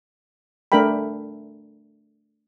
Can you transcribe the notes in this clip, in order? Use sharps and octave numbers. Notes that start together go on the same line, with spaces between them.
A3 D4 A#4 E5 G5 B5